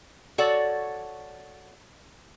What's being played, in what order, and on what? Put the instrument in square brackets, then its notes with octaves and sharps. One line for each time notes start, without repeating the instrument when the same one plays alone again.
[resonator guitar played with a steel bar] F#4 A4 C#5 D5 F#5